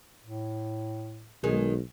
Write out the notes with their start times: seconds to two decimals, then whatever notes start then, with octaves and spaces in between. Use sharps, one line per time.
0.23 A2
1.44 B1 D#3 G#3